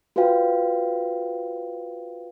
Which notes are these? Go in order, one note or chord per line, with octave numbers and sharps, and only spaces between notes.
F4 F#4 B4 C5 F5 G5